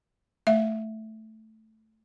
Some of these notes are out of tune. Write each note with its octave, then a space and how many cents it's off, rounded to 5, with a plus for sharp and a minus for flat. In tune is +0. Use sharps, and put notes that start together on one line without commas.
A3 +0 E5 +0